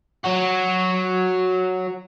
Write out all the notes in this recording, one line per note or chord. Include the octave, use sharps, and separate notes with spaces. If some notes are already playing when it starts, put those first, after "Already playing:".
F#3 F#4